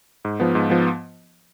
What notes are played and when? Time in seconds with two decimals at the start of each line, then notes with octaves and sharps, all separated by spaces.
0.25 G#2
0.40 F3 B3
0.55 G#2
0.70 F3 B3